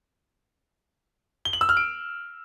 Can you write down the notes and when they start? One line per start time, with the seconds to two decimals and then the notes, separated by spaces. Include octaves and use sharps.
1.45 G7
1.53 F#7
1.61 E6
1.69 F6
1.77 D7